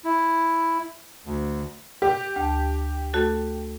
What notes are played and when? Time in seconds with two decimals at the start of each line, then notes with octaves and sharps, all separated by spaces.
0.05 E4
1.26 D2
2.02 G4
2.36 D2 A5
3.13 A3 F#4 A4